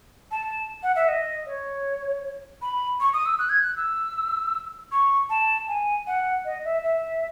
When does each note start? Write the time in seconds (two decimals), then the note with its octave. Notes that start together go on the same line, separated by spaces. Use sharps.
0.31 A5
0.83 F#5
0.96 E5
1.08 D#5
1.46 C#5
2.62 B5
3.00 C#6
3.14 D#6
3.26 E6
3.39 F#6
3.49 G#6
3.61 F#6
3.77 E6
4.92 C#6
5.30 A5
5.68 G#5
6.07 F#5
6.45 D#5
6.65 E5
6.84 E5